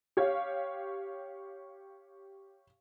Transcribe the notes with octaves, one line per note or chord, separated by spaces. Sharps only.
G4 C#5 F5